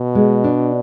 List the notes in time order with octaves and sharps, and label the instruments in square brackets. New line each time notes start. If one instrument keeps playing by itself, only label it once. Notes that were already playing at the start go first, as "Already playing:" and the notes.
Already playing: [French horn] B2
[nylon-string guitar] G#3
D4